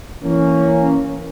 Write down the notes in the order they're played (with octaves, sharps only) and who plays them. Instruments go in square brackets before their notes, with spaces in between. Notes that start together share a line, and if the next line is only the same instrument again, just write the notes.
[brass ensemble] E3 A#3 C#4